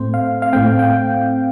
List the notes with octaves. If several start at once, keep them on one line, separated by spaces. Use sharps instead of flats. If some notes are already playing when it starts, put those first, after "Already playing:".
Already playing: A2 A3 C4 C5
F5
F5
A2 A3 C4 G5
G5